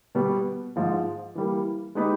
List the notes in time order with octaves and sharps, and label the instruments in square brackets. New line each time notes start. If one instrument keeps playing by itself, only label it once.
[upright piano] B2 G3 B3
G#2 F3 G#3
E3 G3 A#3
G#3 B3 D#4 G4 B4